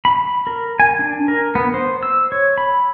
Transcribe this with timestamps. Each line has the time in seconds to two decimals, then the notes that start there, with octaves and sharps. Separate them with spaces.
0.05 B5
0.47 A#4
0.80 G#5
0.99 D4
1.28 A#4
1.55 B3
1.74 C5
2.03 E6
2.32 C#5
2.58 B5